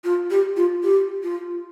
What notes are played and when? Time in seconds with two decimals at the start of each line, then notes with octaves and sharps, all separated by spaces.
0.04 F4
0.30 G4
0.57 F4
0.84 G4
1.23 F4